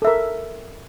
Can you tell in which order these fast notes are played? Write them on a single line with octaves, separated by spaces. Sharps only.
A4 E5 A#4